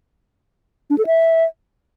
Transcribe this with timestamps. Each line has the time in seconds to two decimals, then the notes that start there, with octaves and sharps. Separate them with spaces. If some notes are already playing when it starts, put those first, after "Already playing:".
0.90 D4
0.98 A4
1.06 E5